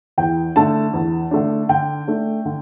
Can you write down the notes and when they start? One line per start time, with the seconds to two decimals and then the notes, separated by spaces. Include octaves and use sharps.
0.18 E2 G5
0.55 D3 A3 D4 A5
0.93 E2
1.31 D3 A3 D4
1.69 D3 G5
2.08 A3 D4
2.45 D3